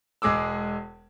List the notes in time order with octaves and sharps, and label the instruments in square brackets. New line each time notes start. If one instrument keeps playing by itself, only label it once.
[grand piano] E1 G#3 G#4 D6 E6